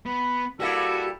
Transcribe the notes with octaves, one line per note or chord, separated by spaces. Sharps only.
B3 B5
G3 A#3 E4 F#4 A4